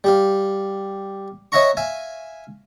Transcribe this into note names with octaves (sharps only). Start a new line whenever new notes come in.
G3 G4 F5
C#5 D#5 E5 F#5 A#5 C#6
E5 F5 G#5